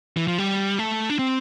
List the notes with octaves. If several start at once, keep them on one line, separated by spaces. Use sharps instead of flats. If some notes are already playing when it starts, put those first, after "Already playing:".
E3
F3
G3
A3
D4
C4